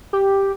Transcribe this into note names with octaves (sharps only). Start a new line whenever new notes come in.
G4